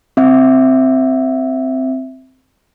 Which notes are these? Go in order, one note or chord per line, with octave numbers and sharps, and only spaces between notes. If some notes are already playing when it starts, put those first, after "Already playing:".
C4 E5